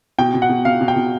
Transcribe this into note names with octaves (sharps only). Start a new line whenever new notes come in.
B2 G5
B2
F#5
B2
B2 F5
B2
G5
B2